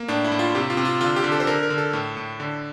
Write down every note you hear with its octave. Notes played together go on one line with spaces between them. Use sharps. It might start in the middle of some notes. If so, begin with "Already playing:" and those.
Already playing: A#3
A2 D4
E4
A2
F4
C3 G4
F4
C3
F4
D3 F4
G4
D3
A4
C5
D3 A#4
A#4
D3
A4
A2
A2
D3